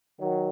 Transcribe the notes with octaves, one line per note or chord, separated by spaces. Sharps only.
D#3 F#3